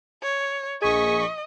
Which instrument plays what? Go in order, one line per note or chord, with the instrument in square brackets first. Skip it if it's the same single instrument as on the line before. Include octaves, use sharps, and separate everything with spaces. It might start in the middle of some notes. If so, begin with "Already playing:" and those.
[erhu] C#5
[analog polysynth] A#1 C#6 B6 [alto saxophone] G#4 [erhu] D#5